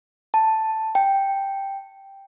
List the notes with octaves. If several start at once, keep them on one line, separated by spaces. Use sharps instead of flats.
A5
G5